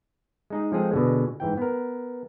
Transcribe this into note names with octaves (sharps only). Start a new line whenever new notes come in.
G#3 D#4 G#4
F3 G#3 C4 G#4 A4
B2 D3 G#3
G#2 E3 G5
B3 A#4